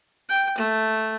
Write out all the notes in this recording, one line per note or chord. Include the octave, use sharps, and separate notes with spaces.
G5
A3